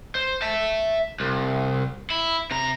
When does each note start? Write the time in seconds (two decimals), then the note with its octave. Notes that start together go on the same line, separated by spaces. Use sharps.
0.15 C5
0.42 E5 A5
1.20 C2
2.10 E4
2.51 C3 A#5